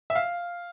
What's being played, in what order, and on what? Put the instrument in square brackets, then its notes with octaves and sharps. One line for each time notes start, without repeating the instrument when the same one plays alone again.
[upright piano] E5
F5